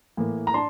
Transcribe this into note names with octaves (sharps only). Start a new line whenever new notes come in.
A2 E3 A#3
A#5
D4 A5 C6